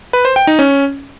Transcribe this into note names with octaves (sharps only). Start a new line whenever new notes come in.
B4
C5
G5
D#4
C#4